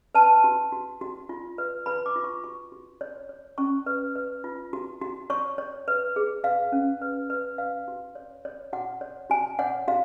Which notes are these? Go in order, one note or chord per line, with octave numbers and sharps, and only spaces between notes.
B4 A5
F#4
F#4
F#4
F4
B4
B4 B5
D6
F4
C#6
F#4 C#6
F#4
C#5
C#5
C#4 C#6
B4
B4
F4
F#4
F#4
C#5 C#6
C#5
B4
G#4
B4 F5
C#4
B4
B4
B4 F5
F#4
C#5
C#5
F#4 F#5
C#5
F#4 G#5
C#5 F#5
F#4 F5